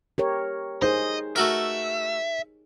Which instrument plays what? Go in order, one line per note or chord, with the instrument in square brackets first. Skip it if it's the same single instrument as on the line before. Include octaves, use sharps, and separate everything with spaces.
[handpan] G4 A#4 C#5
[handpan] D#4 G#4 [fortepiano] C5 [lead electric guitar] D#5
[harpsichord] A3 F#4 A#4 [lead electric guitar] E5